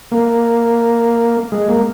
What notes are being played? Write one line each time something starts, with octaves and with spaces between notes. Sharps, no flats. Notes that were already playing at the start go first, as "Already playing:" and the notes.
A#3
G#3
A#3